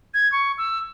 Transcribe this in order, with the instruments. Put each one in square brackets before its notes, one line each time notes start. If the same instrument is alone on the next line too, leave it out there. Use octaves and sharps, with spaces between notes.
[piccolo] G#6
C#6
E6